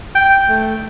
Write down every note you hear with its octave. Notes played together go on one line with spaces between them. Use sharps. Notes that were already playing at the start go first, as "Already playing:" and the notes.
G5
A3